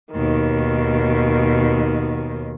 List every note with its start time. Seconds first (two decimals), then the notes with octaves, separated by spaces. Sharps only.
0.12 D#2 B2 D#3